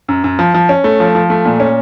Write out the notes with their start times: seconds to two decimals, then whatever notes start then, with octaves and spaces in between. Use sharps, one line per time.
0.09 F#2
0.24 F#2
0.39 F3
0.54 F3
0.69 C#4
0.84 A3
1.00 F3
1.15 F3
1.30 A3
1.45 A#2
1.60 C#4